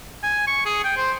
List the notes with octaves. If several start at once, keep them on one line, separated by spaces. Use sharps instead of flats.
G#5
C#6
G#4
G5
C5